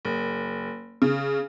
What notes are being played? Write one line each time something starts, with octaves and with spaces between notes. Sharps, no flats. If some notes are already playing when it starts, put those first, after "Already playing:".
F#1
C#3